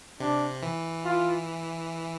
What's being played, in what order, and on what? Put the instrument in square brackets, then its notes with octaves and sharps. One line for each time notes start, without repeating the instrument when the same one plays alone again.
[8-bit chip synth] C3 [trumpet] D4
[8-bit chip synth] E3
[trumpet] F4